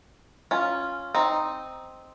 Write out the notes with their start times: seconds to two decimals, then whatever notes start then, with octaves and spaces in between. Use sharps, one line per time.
0.51 C#4 F4
1.15 C4 D#4